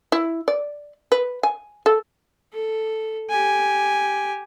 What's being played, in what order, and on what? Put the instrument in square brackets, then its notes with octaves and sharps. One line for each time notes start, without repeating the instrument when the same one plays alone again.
[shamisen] E4
D5
B4
G#5
A4
[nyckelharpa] A4
G4 G#5